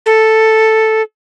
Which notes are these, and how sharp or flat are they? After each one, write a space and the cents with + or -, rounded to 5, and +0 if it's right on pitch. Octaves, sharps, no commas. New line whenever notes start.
A4 +0